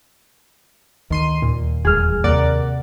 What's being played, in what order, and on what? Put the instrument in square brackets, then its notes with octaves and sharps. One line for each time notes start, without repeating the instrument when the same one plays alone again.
[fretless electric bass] D2 [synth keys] D#3 C6 D#7
[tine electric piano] D#2 [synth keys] A#2
[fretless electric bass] E1 G3 [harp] G#4 F6
[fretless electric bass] D#2 [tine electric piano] C3 A#3 [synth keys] A#4 D5 F#5